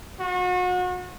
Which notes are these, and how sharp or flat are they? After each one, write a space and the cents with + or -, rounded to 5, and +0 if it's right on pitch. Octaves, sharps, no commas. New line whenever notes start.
F#4 -35